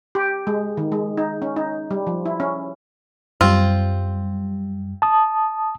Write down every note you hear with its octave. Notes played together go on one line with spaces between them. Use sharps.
G4
G#3
D#3
G#3
D#4
C#4
D#4
G3
F3
E4
C#4
F#2 G3 C4 F4
A5 D#6